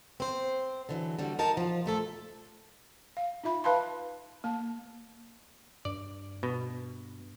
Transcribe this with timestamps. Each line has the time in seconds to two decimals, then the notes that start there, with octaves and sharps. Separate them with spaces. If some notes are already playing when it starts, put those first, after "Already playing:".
0.20 C4 C5
0.89 D3 E3 F#3
1.19 D3 G3 F#4
1.39 D#4 F#4 A#4 A5
1.57 F3 F4
1.86 A#2 A3 A4
3.17 F5
3.44 D#4 F4 E5 B5
3.64 B4 F5 A5 B5 C6
4.44 A#3 A5
5.85 G2 D5
6.43 B2